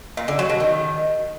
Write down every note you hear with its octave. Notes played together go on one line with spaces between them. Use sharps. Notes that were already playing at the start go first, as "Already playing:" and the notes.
A#2
D3
F#3
B2
D#3